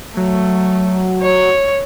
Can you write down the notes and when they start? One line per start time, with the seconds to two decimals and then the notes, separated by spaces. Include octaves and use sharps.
0.17 F#3 A3
1.22 C#5